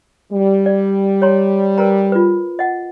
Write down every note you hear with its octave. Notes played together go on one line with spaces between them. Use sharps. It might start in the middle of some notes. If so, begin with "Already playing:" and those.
G3
D5
C#5 A#5 C6
A#4 B4 A#5
F4 B4
D#5 F#5